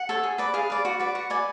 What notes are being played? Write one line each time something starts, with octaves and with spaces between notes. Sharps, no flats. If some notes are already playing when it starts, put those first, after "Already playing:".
Already playing: F#5
A4 C#5
G#4
B4 D5
G#4 F5
B4 D5
F#4
B4 D5
F#4 F#5
B4 D5 G#5